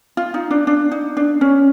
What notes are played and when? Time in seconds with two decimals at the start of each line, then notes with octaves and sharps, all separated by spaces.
0.17 F4
0.34 D#4
0.51 D4
0.67 D4
0.91 D#4
1.17 D4
1.41 C#4